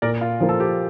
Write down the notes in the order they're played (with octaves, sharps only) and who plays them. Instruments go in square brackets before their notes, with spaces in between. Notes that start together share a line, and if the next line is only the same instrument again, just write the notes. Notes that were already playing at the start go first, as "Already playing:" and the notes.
[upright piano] A#2 [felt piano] A#4 D5
[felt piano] F4
[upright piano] F3 A#3
[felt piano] A4
G4